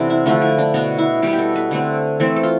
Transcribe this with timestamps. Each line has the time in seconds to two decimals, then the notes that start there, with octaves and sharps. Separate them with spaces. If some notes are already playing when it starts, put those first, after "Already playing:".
Already playing: C3 E3 B3 D4 G4 A4
0.10 E4
0.26 D3 F3 A3 D4
0.42 E4
0.58 D4
0.74 B2 B3 D4
0.98 E4
1.22 B2 G3 B3 G4
1.33 G4
1.39 A4
1.56 B4
1.71 D3 A3 C4
2.20 E3 A3 C4 A4
2.36 A4
2.43 F4